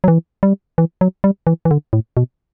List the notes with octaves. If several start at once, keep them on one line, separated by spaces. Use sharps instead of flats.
F#3
E3
G3
E3
F#3
G3
E3
E3
D3
A2
B2